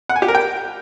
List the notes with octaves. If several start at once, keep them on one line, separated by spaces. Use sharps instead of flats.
F#5
G#5
G4
A#4
G5